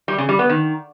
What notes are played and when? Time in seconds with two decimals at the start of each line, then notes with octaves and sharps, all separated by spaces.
0.08 G3
0.18 C#3
0.29 G3
0.39 B3
0.49 D#3